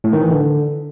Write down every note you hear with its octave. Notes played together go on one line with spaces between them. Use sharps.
A2
D#3
E3
D3